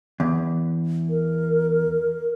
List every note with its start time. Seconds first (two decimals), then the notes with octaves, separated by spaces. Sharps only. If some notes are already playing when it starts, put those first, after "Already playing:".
0.20 E2
1.09 A#4